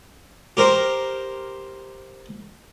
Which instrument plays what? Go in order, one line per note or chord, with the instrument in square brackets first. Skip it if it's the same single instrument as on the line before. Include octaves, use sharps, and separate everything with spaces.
[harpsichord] G4 A#4 C5